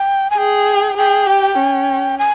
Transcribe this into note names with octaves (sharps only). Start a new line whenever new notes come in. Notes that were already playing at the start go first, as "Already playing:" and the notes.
Already playing: G5
G#5
G#4 G5
G#4 G5
G4
C#4
G#5